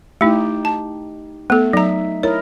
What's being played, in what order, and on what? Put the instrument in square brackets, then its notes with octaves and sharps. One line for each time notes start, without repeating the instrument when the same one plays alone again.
[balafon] A3 E4 [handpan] D#4 G4
[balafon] A5
[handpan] A3 [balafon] B3 A4
[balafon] F#3 A#5 [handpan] D#4 E5
[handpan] E4 A#4 D#5 [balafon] C#5